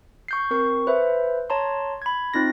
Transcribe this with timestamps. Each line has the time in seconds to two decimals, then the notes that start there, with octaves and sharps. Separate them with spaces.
0.28 C#6 G6 C7
0.51 C4 A#4 C#6
0.87 B4 C5 E5
1.50 C#5 A5 A#5 C6
2.02 B5 G#6
2.34 C4 D#4 F4 A#6